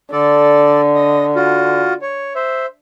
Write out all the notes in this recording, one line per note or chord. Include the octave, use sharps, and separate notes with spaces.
D3 A4 D5
D#5
F4 F#4
C#5
C5 E5